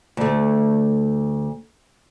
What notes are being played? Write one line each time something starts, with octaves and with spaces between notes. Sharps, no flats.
D2 A3